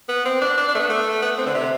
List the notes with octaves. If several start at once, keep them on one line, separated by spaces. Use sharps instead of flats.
B3
C4
D4
D4
D4
A3
B3
A3
B3
C4
D3
C3